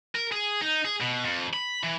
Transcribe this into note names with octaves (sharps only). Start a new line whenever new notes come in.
A#4
G#4
D#4
G#4
B2
F2
B5
E3